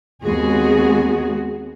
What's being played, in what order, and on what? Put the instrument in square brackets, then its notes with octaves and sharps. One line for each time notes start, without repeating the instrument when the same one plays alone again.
[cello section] D#2 G#3 B3 C4 F#4 G#4